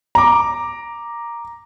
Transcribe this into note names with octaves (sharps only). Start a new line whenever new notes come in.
A#5 D6